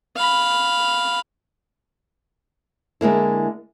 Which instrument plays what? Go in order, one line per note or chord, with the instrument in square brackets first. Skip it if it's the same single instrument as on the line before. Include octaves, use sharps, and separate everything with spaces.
[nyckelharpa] F5 B5
[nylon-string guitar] D3 G#3 A#3 E4